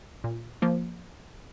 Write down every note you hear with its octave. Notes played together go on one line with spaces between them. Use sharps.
A#2
F3 A#3